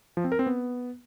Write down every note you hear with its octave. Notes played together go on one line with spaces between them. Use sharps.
F3
C4
A#4
C4
B3